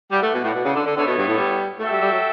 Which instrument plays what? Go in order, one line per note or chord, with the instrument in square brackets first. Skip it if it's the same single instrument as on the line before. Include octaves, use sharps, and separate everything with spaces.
[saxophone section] G3 [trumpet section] E4 B4 D5 F#5
[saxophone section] A3
B2
A2
B2
C#3
D3
D3
[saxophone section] D3 [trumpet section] B3 E4 A4 C#5
[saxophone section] B2
G2
A2
G3
[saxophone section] A3 [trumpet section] F#4 A4 E5 G5
[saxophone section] G3
G3
F#3